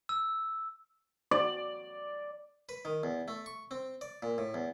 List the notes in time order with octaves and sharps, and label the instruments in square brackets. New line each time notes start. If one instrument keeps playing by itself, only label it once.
[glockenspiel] E6
[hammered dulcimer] D5
[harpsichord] B4
D#3
E2
A3
C#6
C4
D5
A#2
A2
E2